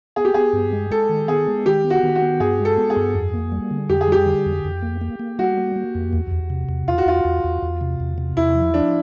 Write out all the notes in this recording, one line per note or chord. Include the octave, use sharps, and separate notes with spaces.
B3 G#4
G4
B3 G#4
G2
G#3
G#3 A4
D#3
B3 G#4
G#3
D#3 G4
B3
F#4
D#3
F#4
B3
G2 G#4
G#3
A4
B3
G#4
G2
F2
A#3
G3
D3
F2 G4
G#4
G3 G4
D3
F2
F2
A#3
A#3
A#3
G3 F#4
A#3
A#3
F2
E2
E2
C3
E2
E2 F4
F#4
E2 F4
E2
E2
E2
C3
E2
C3
E2 E4
F3
F3 D4